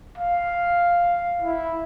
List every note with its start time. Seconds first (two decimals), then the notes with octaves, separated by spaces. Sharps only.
0.18 F5
1.42 E4